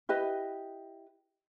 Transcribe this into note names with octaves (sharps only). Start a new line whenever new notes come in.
E4 G4 B4 D#5